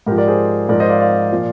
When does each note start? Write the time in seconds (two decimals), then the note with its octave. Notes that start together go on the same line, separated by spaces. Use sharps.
0.07 G#2 G4 A#4
0.11 F3
0.17 A#4 D5
0.28 G#4 C5
0.69 G#2 F3 A#4 D5
0.80 C5 D#5
0.90 D5 F5
1.00 D5 F5
1.32 A#2 F3